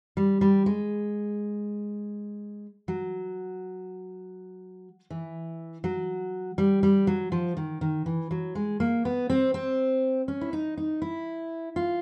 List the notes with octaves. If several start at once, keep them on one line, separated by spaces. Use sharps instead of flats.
G3
G3
G#3
F#3
E3
F#3
G3
G3
F#3
F3
D#3
D#3
E3
F#3
G#3
A#3
B3
C4
C4
C#4
E4
D#4
D#4
E4
F4